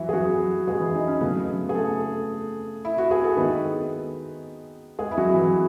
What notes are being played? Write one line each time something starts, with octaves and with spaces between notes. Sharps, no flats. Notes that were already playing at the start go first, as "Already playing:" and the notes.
Already playing: E3 F#3 E4 F#4
G#4
F#3 F#4
G#3 G#4
E3 E4
D#4
C#4
C#3 F#3 A3 B3 B4
G#4
A3 A4
E4
F#4
G#4
A4
D#3 G#3 B3 B4
G#3 G#4
E4
F#3 F#4
E3 E4